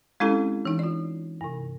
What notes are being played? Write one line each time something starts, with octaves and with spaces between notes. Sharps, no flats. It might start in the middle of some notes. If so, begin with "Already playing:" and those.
G#3 C4 C#4 E4 G4 A4
E3 D#4
F4 D5
G2 C3